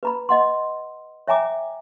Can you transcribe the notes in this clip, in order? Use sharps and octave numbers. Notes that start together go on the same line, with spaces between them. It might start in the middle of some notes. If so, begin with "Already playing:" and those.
B4 A#5 B5
D#5 F#5 C6
C#5 E5 G5 G#5 A#5 D6